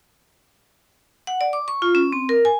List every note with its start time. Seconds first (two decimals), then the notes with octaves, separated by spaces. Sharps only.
1.27 F#5
1.41 D5
1.53 D6
1.68 C#6
1.82 F4
1.95 C#4
2.12 C4
2.29 A#4
2.45 G#5